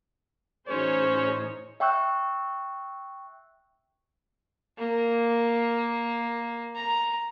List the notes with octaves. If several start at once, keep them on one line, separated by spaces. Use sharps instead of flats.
A2 E3 C#4 D#4 F#4 G#4 C5 C#5
E5 G5 C#6 E6 F#6
A#3
A#5